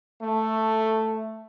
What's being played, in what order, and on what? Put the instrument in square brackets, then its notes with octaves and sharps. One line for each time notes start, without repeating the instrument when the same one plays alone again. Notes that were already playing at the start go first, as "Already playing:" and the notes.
[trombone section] A3